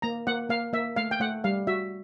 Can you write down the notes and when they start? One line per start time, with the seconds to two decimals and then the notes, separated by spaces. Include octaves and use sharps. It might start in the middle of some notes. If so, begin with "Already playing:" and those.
0.02 A#3 A#5
0.27 A#3 F#5
0.49 A#3 F5
0.73 A#3 E5
0.96 A3 F5
1.11 G5
1.20 A3 F#5
1.44 G3 F5
1.67 F#4 E5